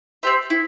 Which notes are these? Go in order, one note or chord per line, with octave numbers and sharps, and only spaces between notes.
C4 G4 C5 E5
E4